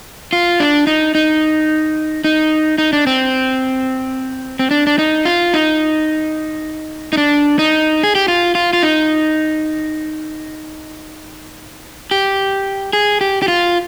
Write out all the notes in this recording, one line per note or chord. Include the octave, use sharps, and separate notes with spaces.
F4
D4
D#4
D#4
D#4
D#4
D4
C4
C4
D4
D4
D#4
F4
D#4
D#4
D4
D#4
G#4
G4
F4
F4
F4
D#4
G4
G#4
G4
G4
F4